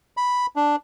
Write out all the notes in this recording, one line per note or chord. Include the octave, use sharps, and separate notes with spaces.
B5
D4